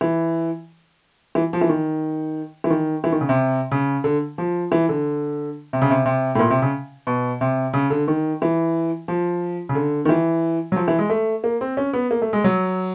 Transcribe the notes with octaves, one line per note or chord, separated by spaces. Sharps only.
E3
E3
F3
E3
D#3
E3
D#3
E3
D#3
C#3
C3
C#3
D3
F3
E3
D3
C3
C#3
C3
C3
A2
A#2
C3
C#3
B2
C3
C#3
D3
D#3
E3
F3
C#3
D3
D#3
E3
F#3
F3
E3
G#3
A3
A#3
C4
C#4
B3
A#3
A3
G#3
F#3